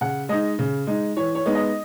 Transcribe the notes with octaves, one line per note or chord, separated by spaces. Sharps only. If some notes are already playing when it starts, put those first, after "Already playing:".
C#3 F#5
G#3 D#4 D#5
C#3
G#3 D#4
E3 C#5
C#5
G#3 B3 D#4
D#5